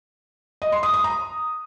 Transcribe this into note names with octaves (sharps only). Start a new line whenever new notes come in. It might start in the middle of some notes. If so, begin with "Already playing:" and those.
D#5
C6
D#6
D#6
A#5